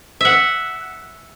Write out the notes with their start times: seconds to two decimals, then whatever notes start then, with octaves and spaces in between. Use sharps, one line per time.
0.21 E5 F#5